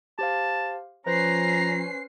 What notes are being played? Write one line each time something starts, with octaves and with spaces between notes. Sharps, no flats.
G4 C5 F5 A5
F3 C#4 B4 C5 A#5 C7